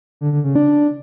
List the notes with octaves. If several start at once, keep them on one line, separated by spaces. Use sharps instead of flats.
D3
D3
C#3
D4